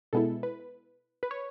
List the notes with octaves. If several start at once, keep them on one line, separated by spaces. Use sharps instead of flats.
B2 G#3 B3 E4 A4
B4
B4
C#5